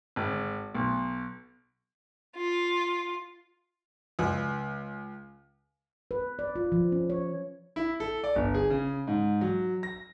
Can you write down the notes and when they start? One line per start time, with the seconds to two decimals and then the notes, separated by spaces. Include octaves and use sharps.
0.16 G#1
0.75 B1
2.36 F4
4.19 C#2
6.11 B4
6.39 D5
6.56 F4
6.72 F3
6.92 C#4
7.10 C#5
7.76 E4
8.00 A4
8.24 D5
8.36 G1
8.54 G#4
8.70 C#3
9.07 G#2
9.41 F#3
9.83 A#6